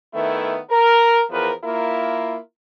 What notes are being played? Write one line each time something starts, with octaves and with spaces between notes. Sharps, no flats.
D#3 A3 B3 E4
A#4
E2 F3 A#4 B4
A#3 E4 F4 A#4